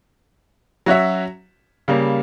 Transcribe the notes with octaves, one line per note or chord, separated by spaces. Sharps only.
F#3 C#4 F#4 C#5 E5
C#3 G3 A#3